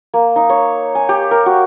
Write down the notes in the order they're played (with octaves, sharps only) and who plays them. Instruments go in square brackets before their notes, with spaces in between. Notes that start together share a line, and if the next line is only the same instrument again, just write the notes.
[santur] A#3
D#4
C#5
G#5
G4
A#4
F#4